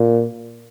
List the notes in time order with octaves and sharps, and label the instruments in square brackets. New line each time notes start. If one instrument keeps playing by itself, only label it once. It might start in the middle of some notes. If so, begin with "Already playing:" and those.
Already playing: [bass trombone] A#2